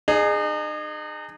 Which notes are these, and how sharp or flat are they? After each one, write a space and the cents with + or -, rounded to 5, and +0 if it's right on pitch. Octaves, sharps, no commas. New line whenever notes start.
D#4 -40 G#4 +0